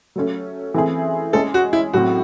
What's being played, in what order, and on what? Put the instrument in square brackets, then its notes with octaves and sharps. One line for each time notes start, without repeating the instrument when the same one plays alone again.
[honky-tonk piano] F#3 A3 C#4
E3 A3 C4 E4 G#4
[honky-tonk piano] G#3 C#4 G#4 [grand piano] A4
[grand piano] F#4
E4
[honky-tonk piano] A2 F#3 C4 [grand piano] F#4